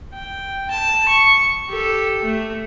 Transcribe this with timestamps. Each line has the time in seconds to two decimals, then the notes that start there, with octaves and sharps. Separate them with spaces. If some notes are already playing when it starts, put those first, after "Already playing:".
0.14 G5
0.71 A5
1.08 C#6
1.69 G4 A4
2.23 A3